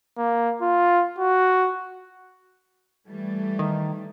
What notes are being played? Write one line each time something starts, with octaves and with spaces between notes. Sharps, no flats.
A#3
F4
F#4
E3 G3 A3
D#3